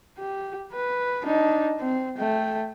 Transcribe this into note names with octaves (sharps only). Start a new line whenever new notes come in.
G4
B4
D4 D#4
C4
A3 G5